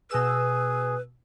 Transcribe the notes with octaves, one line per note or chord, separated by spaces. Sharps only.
B2 G#4 B4 E6